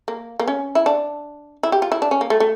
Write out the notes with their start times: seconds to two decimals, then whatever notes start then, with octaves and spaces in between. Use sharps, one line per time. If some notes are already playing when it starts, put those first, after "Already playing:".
0.08 A#3
0.40 A#3
0.48 C#4
0.75 E4
0.86 D4
1.63 E4
1.72 G4
1.82 F4
1.92 E4
2.02 D4
2.11 C#4
2.21 A#3
2.30 A3
2.40 A3